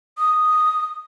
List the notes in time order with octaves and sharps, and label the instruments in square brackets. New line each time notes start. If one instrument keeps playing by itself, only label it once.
[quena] D#6